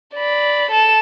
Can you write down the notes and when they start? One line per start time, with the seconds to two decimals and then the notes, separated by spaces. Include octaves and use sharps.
0.14 D5 B5
0.71 A4 E7